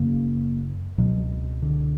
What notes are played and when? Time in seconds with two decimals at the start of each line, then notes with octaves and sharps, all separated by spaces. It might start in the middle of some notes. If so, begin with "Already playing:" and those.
Already playing: F#1 F#2 C#3 A#3
0.98 C#2 B2 F#3
1.62 D3